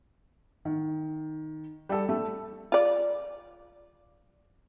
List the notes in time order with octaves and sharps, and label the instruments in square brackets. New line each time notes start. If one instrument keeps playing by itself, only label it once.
[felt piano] D#3
G3 A4
A3
[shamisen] F4 D5